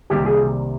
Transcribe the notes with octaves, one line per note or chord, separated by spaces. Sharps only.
C2 C3 D#3 G3 A#3 G4
G#4